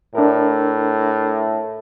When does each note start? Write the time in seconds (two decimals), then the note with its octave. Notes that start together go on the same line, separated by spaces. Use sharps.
0.15 A2 D4 A#4